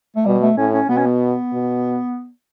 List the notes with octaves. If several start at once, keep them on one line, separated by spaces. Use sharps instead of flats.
A3
B2 G3
A3
A2 C#4
C#4
B2 B3
C#4
B3
B2